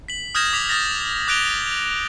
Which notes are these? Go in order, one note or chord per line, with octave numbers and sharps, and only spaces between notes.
B6 F#7
D#6 F6 G6 G#6 A#6 E7
D6 B6 F7 F#7
D#6 F6 A6 A#6
D6 F#6 A#6 D7 F7 G7